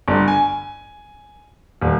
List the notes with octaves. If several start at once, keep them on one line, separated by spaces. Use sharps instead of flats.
G1
G#5
D#1